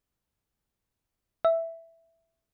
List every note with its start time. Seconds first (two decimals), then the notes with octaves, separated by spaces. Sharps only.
1.45 E5